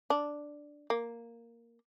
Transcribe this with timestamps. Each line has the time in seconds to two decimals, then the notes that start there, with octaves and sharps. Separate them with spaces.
0.10 D4
0.90 A#3